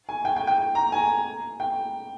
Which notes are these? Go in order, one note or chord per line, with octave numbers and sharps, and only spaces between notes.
G#5
G5
G5
G5
A#5
G#5
G5